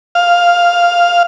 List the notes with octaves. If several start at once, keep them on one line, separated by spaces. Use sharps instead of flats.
F5